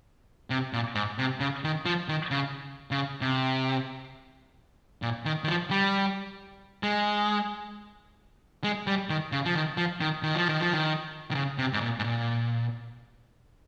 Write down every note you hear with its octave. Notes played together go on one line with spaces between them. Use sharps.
C3
A#2
G#2
C3
C#3
D#3
F3
D#3
C#3
C#3
C3
A#2
D#3
D#3
F3
G3
G#3
G#3
G3
D#3
C#3
F3
D#3
F3
D#3
D#3
F3
D#3
F3
D#3
D#3
C#3
C3
G#2
A#2
G#2
A#2